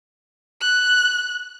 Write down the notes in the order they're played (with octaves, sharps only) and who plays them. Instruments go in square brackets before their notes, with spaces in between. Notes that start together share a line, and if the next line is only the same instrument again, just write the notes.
[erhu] F#6